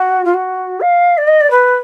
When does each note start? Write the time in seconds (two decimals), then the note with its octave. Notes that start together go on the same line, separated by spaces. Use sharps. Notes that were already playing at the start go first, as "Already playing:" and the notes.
Already playing: F#4
0.25 F4
0.34 F#4
0.81 F5
1.17 D5
1.27 D#5
1.40 D5
1.50 B4